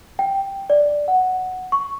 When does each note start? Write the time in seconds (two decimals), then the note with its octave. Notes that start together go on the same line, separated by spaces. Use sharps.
0.19 G5
0.70 D5
1.08 F#5
1.72 C#6